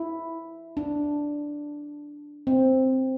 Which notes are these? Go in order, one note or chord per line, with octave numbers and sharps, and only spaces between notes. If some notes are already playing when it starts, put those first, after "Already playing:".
Already playing: E4
D4
C4